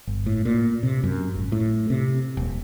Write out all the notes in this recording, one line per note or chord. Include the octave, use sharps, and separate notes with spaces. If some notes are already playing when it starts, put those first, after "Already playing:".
G1
A2
A#2
C3
F#2
G#1
A2
C3
D#1